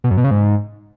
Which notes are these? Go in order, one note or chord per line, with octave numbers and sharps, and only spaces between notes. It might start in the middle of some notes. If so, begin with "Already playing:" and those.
B2
F#2
B2
C#3
G#2